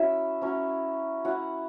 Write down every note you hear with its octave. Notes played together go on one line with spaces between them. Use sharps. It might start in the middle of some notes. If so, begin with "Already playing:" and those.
Already playing: F#3 C#4 E4 E5
F#3 C#4 E4
F#3 C#4 E4 F#5